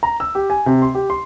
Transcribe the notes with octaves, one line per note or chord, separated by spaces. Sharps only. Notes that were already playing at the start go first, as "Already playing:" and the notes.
A#5
E6
G4
G#5
C3
C6
G4
C6